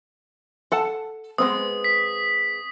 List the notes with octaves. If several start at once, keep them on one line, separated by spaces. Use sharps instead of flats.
A4 F#5 A5
G#3 B3 C4 D#6
B6